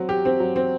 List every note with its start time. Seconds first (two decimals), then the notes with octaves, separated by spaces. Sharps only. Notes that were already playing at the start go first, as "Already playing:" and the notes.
Already playing: F#3 C4
0.09 G4
0.25 C4
0.40 F#3
0.56 C4